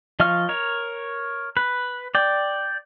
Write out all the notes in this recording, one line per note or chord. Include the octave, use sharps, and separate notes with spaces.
F3 D#5 F5 C#6 F6
A#4 C#5
B4
D5 G5